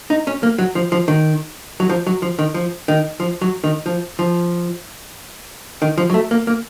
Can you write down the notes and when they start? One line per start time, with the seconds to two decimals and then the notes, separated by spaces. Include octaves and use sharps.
0.10 D#4
0.27 C#4
0.43 A#3
0.59 F#3
0.75 F3
0.92 F3
1.08 D#3
1.80 F#3
1.89 F3
2.07 F#3
2.22 F3
2.39 D#3
2.54 F3
2.88 D#3
3.20 F3
3.42 F#3
3.64 D#3
3.86 F3
4.19 F3
5.82 D#3
5.98 F3
6.10 F#3
6.14 A3
6.31 A#3
6.47 A#3